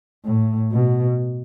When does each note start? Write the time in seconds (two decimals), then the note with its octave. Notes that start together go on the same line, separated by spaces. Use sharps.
0.25 A2
0.72 B2